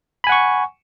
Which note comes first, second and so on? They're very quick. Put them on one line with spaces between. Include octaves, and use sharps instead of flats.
B5 G#5 F#5 C#6